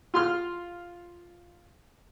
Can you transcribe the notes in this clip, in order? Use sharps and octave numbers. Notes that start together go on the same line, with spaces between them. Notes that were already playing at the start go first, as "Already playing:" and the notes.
F4 C6 F6